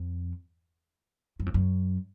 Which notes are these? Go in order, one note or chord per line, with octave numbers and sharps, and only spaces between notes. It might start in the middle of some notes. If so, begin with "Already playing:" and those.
Already playing: F2
F#2
F2
F#2